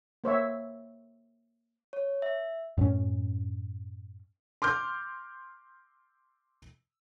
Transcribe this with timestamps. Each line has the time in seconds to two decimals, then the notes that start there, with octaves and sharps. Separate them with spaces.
0.24 A#3 C5 C#5 E5
1.93 C#5
2.22 E5
2.78 F#2 A2 A3 C#4
4.62 C6 D6 F6 G6